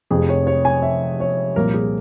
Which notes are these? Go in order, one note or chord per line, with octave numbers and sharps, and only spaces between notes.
F1 F2 C3 G#4
C#5
C#5
G#5
E5
C#5
C2 A#2 F3 A#3 F4 A#4
G#4